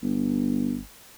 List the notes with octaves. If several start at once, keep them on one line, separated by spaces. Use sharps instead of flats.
G1